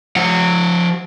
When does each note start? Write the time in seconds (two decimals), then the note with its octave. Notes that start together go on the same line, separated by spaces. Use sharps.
0.16 F3 F#5